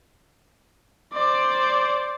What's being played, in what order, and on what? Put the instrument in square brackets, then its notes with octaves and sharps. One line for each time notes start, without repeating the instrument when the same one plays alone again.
[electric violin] C5 D5